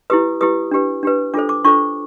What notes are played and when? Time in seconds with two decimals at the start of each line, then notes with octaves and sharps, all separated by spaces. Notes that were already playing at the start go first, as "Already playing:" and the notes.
0.10 E4 G4 B4 D#6
0.41 E4 G4 B4 D#6
0.71 D4 G4 B4
1.03 D4 G4 B4
1.34 D4 F4 A4 C5 D6
1.49 D6
1.65 D4 F4 A4 C5 C#6